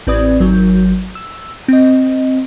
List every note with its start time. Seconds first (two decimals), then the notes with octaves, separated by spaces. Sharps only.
0.07 A1 C4 B4 D5 D#6 G#6
0.40 G#1 F#3 A#4 G6
1.15 E6
1.68 C4 D#5